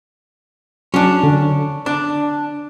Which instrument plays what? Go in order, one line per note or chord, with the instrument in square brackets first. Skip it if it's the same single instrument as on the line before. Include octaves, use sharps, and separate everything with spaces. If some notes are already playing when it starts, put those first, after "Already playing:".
[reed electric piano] F#3 [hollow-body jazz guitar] C#4 D4
[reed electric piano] D3
[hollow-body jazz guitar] D4 [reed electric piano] A5